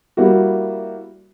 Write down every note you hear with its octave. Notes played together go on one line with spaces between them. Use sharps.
G3 A#3 E4 F#4